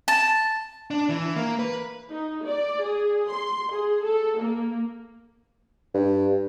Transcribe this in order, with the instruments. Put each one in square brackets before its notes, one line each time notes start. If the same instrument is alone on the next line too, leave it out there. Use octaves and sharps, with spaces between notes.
[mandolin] A5
[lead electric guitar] D4
E3
A#3
B4
[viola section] D#4
D5
G#4
C6
G#4
A4
A#3
[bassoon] G2